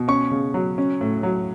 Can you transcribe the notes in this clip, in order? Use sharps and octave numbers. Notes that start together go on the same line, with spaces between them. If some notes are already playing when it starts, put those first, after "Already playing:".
Already playing: B2
C#4 C#6
C#3
F#3
C#4
A2
F#3